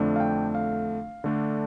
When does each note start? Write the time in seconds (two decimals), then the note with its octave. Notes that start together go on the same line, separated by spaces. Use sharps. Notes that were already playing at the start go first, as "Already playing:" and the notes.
Already playing: F2 D3 A3 D4
0.16 F5
0.20 G5
0.55 F5
1.24 D3 A3 D4